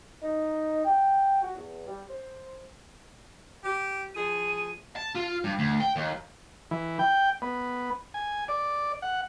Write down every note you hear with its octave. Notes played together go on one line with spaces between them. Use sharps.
D#4
G5
F#4
E2
G3
C5
G4
F3 G#4 D#7
A5
F4
G2
D2
G5
D#2
E3
G5
B3
G#5
D5
F#5